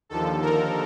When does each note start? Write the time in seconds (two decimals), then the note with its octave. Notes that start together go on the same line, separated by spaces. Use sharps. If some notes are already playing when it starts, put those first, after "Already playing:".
0.09 D#2 D3 F3 A4
0.42 A#4